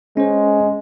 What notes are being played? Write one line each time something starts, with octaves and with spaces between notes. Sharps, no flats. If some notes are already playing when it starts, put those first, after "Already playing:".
G#3 C#4 C5